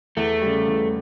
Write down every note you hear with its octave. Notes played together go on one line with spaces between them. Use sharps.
E2 A3
C#3 G3
E2